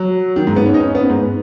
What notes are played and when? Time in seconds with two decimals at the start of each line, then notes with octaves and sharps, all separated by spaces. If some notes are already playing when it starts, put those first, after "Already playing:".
Already playing: F#3
0.36 D#3
0.47 G#2
0.56 B3
0.66 C#4
0.74 D#4
0.80 C#4
0.95 B3
1.09 G#2